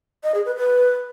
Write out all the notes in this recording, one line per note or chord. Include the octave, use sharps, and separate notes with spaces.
D#5
G#4
B4
B4